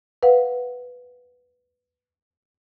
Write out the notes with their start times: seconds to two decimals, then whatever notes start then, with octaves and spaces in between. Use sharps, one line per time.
0.23 B4 F5 F#5